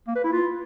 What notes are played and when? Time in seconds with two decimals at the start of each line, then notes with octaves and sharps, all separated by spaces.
0.07 A#3
0.16 B4
0.24 E4
0.32 F4